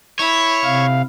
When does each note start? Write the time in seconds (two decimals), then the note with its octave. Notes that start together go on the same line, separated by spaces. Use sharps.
0.19 E4 C#5
0.64 C3 F5